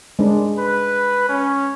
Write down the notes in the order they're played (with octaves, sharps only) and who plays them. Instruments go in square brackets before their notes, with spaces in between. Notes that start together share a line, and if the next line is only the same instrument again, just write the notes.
[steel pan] G#3 D4
[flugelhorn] B4
C#4